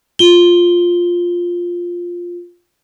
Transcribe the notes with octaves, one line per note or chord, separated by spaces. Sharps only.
F4 G7